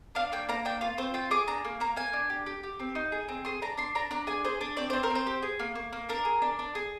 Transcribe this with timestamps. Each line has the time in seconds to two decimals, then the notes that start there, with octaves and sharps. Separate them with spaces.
0.15 D4 F5
0.32 A#3 G5
0.49 A#3 A#5
0.65 D4 G5
0.81 F4 F5
0.98 C4 C5
1.14 F4 G5
1.31 G#4 D6
1.48 D4 A#5
1.65 A#3
1.80 A#3 A#5
1.96 A#3 G#5
2.13 D4
2.30 G4
2.46 G4
2.63 G4
2.80 C4
2.95 D#4
3.12 G#4
3.29 C4
3.45 G#4 C6
3.62 D4 A#5
3.78 D4 C6
3.95 D4 A#5
4.11 D4 A#5
4.27 G#4 G#5
4.44 G#4 C5
4.61 D4
4.77 C4 D5
4.90 C4 C5
5.03 A#4
5.10 C4
5.15 C5
5.27 G4
5.43 G#4
5.60 A#3
5.75 A#3
5.93 A#3
6.09 D4 A#4
6.25 G#4
6.42 D4
6.59 D4
6.75 G#4